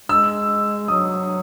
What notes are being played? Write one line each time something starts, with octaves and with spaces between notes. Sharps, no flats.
G#3 E6
F#3 D#6